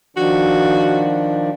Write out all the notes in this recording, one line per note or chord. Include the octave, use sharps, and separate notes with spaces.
D#3 F3 D4 F#4